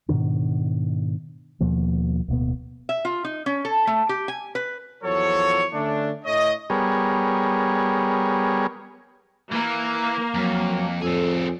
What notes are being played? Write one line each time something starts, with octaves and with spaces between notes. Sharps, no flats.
G#2 B2 D#3 D4
D#2 B2 F3 A#3
D1 B2 A#3 B3
E5
F4
D#4
C#4
A4
A3
G4
G#5
B4
E2 F3 F#3 A4 C#5
D3 A3 C#4 D4
A2 A3 C#5 D#5
G3 B3 G#4 A#4 C#5
E3 A#3
F2 F#3
F2 C4 G#4 A4